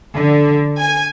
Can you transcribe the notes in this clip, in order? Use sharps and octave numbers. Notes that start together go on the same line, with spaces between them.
D3
G#5